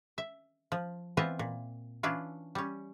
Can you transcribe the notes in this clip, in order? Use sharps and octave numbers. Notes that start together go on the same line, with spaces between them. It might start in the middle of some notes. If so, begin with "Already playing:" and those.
E5
F3
E3 B3 C4 F4 D#5 E5
A#2
E3 C#4 D4 E4 F4
G3 C#4